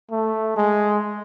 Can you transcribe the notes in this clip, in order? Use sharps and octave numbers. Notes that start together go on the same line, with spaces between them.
A3
G#3